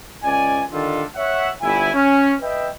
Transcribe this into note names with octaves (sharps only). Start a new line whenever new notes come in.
C#2 C#4 D5 G#5
D3 D#3 G3 D4 F4 A4
C#5 E5 F#5
G1 E4 G#5
C#4
B4 D#5 E5 G5